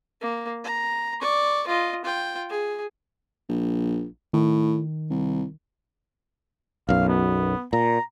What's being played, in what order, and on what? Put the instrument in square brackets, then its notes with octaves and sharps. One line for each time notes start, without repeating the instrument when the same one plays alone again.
[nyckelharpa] A#3
A#5
D5 C#6
F4 D#5
F4 G5
G#4
[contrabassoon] A#1
[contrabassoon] A2 [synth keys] D#3
[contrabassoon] C2
[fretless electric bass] B1 F#2 [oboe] F5
[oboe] B3
[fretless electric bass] A#2 [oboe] A#5